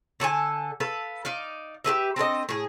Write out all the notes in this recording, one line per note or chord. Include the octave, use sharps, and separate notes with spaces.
D3 A4 C#5 G#5
A4 B4 F5
D#4 D5 F5
G4 G#4 B4 E5
C4 D4 A4 D#5
A2 G#4